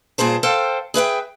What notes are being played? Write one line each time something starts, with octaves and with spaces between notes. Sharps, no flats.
G2 A#2 G#4 C5 A5
A4 C5 F5 G5
G#4 B4 E5 G5